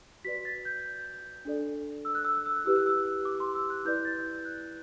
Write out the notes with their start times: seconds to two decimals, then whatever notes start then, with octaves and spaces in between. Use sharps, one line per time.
0.25 F#4 B4 D5 B6
0.45 A6
0.65 G6
1.45 D4 A4 D5
2.05 E6
2.15 F#6
2.25 E6
2.35 F#6
2.46 E6
2.55 F#6
2.65 E4 G4 B4 E6
2.76 F#6
2.86 E6
3.25 D6
3.40 C6
3.55 E6
3.70 F#6
3.85 E4 B4 D5 G6
4.05 A6
4.45 F#6